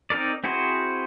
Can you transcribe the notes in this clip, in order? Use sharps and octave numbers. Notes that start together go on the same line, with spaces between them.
C4 D#4 A#4 D5
C4 E4 F#4 G#4 C5